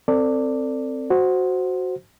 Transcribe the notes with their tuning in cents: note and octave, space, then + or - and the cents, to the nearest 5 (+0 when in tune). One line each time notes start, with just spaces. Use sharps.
C4 +0 A4 +35 D5 +0
F#4 +0 C5 +0